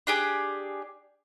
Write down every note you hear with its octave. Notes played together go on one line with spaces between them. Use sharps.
D4 G4 G#4